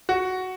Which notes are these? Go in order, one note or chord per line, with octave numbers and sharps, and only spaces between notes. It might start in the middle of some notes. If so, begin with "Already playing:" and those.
F#4